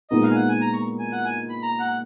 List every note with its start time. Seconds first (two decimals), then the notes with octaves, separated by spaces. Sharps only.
0.10 A#2 G#3 B3 D#4 D#5
0.23 F5
0.31 G#5
0.35 F#5
0.48 G#5
0.61 A#5
0.73 C#6
0.99 G#5
1.12 F#5
1.24 G#5
1.50 B5
1.63 A#5
1.80 F#5